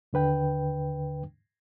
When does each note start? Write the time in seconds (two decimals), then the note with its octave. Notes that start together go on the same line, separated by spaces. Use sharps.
0.13 D#2 D3 B4 G5